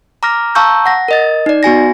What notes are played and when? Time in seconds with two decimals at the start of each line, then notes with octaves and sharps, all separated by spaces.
0.23 A#5 D6 F6 A#6
0.55 F5 A5 A#5 C#6 E6 G6
0.86 F#5 A#6
1.08 A#4 D#5 A6
1.46 D#4 D5
1.63 B3 F#4 G#5 A#6